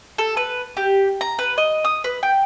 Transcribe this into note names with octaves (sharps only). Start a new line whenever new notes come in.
A4
B4
G4
A#5
B4
D#5
D#6
B4
G5